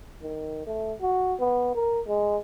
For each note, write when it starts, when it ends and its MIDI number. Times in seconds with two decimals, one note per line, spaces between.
0.22 0.63 51
0.67 0.93 57
1.02 1.34 66
1.40 1.71 59
1.74 2.00 70
2.08 2.37 56